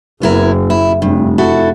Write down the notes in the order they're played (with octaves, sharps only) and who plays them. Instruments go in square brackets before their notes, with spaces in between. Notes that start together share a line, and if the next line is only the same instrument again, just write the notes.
[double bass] F#1 [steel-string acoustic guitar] B3 E4 A#4
[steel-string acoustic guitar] E4
[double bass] F1 [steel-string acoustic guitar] G2
[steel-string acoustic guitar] E4 F#4 A4